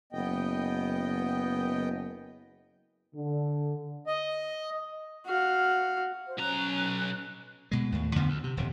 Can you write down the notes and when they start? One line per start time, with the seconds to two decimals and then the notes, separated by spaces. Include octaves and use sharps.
0.13 F#1 B3 D#5 G5
3.15 D3
4.07 D#5
5.26 F#4 F5
6.26 C5
6.38 B1 C#4 A#5 F#6
7.71 B2 G#3
7.92 D#2 A2
8.15 F2 D3 F3 B3
8.29 D2
8.44 C3
8.57 D#1 F2